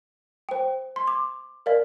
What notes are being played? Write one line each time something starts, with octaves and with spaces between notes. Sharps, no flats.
C5 G5
C6
D6
A#4 D5 F5